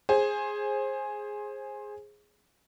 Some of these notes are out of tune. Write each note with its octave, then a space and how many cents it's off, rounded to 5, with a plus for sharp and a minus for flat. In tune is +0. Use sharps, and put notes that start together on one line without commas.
G#4 +0 C5 +25